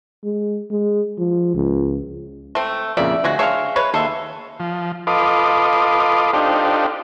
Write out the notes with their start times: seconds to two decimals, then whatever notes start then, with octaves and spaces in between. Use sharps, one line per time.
0.24 G#3
0.71 G#3
1.19 F3
1.55 C#2
2.55 A3 C4
2.97 F2 A#2 C#3 D5 E5
3.24 D2 C#3 G#3 F#4
3.39 D4 G#4 C#5 E5 F5 C6 C#6
3.76 G#3 B4 C#5
3.94 D#2 A4 E5 C6
4.60 F3
5.07 F4 A4 B4 D#5 C6 D6
6.33 D4 D#4 F4 G4 A4 C5